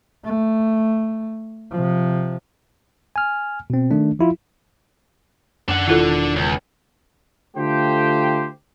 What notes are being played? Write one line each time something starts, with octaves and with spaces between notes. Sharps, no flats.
A3
C3 F3
G#5 F6
B2 C4
D#3 A3 D4
F3 E4 F4
F#2 D4 F#5
E1 D#3 E4 F4 A4
C#2
D3 A3 F4 G4 C5 G5